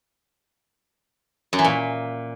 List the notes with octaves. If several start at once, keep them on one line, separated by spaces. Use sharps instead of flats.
F#2
E3
A#2